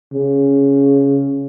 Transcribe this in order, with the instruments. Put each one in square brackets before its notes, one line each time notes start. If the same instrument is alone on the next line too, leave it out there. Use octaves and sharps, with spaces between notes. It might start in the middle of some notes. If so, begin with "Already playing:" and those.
[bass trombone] C#3